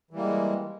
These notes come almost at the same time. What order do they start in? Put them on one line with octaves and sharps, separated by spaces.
E3 G3 A#3 G#3